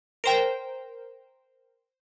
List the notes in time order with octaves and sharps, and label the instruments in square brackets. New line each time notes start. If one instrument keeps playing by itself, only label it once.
[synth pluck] A#4 C5 G5